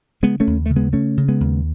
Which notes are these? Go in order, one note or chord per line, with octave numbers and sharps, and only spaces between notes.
C#3 G#3 B3
A3 C#4
D#2
C#3 A3
G#3 B3
C#3 A3 C#4
C#3
G#3 B3
D#2